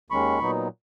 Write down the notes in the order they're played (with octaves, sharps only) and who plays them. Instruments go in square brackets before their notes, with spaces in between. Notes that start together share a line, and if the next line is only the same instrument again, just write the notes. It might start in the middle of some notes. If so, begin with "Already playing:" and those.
[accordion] D#2 D#3 G#3 C#4 B5 C#6
A#2 F#3 B3 D#4